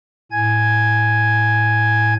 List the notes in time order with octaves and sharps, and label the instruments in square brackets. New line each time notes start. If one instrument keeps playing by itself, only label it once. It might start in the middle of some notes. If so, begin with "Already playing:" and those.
[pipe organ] A2 G#5 G#6